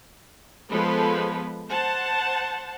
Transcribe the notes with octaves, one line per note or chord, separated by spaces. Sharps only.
F3 G#3 B3 A4 B4
C5 F#5 A5